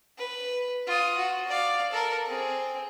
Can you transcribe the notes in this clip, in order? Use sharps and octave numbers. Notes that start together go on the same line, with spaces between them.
B4
F4 D#6
F#4
D5 F5
A4 A#4
C4 G#4